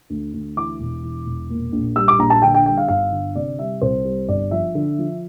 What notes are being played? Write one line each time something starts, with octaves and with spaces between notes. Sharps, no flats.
D2
D2
E3 D6
E1
E3
E1
A#2
A#1
G3 E6
D6
A#1 A#5
A5
D3 G5
G5
G3 G5
F5
G1 F5
D3
C3 D5
G3 E5
C2 C5
G3
G1 D5
F3 E5
D3
F3